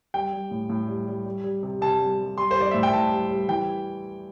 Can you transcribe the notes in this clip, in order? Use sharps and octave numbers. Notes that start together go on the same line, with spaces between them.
G3 G5
G3
A2
A2
G3
G3
G3
G3
C3
C3 A5
G3
G3
G3 C6
G3 C5
D5
A2 E5
G5
A2 A5
G3
G3
E3 G5